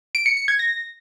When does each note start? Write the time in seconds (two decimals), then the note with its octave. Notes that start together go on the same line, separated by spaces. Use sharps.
0.15 D7
0.26 C#7
0.37 C#7
0.48 G#6
0.59 A#6